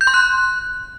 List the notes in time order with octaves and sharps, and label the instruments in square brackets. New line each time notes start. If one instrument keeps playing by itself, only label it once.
[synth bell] G6
C6
F#6